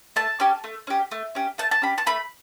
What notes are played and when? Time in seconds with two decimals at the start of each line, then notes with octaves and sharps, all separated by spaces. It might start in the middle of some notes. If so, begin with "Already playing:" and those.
0.16 A3 A5
0.40 C#4 G4
0.64 A3
0.87 C#4 G4
1.11 A3
1.35 C#4 G4
1.58 A3 A5
1.71 A5
1.82 C#4 G4 B5
1.98 A5
2.06 A3 B5